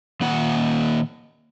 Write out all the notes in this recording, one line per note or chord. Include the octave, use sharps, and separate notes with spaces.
A#2 D#3 A#3 F#5